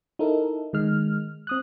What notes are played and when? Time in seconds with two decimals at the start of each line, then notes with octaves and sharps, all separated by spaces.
0.19 D#4 E4 A4 A#4
0.73 D#3 G#3 F6
1.47 C4 D#6 F#6